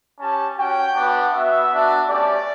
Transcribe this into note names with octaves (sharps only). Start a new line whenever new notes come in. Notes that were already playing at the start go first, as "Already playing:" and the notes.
C#4 G4 A5
C#4 F#4 G5
B3 D4 F#4
B3 F#4 E5
B3 D4 F#4
A3 C#4 G4 D5